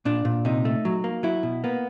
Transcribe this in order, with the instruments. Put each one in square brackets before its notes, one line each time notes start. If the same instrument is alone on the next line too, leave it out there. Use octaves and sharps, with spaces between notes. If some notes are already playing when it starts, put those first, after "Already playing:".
[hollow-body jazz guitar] A#2 D4
A#2
C3 D#4
A3
F#3
A#3
F#3 E4
B2
A#3 B3